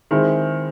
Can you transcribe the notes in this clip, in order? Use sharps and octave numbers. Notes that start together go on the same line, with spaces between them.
D#3 G#3 C4 E4